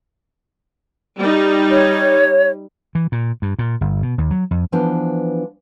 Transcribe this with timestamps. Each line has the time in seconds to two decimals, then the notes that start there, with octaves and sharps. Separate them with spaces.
1.19 G3 D#4
1.70 C#5
2.95 E3
3.12 A#2
3.42 G2
3.59 A#2
3.81 G1
4.03 B2
4.18 D#2
4.31 F#3
4.51 F2
4.72 E3 F3 B3 D4 C5